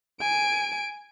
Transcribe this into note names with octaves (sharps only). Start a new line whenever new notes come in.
G#5 D7